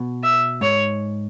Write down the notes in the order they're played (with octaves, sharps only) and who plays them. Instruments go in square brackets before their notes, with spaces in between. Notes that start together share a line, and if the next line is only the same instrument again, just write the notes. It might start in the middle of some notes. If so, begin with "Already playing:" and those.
Already playing: [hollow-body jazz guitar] B2
[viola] E5
[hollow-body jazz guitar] G#2 [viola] C#5